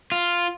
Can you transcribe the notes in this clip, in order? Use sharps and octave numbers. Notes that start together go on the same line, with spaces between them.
F4